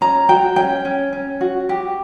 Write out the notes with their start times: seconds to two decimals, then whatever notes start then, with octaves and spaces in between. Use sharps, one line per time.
0.01 C#4 A#5
0.29 F#4 G5
0.56 C#4 G5
0.85 C#4
1.13 C#4
1.41 F#4
1.69 G4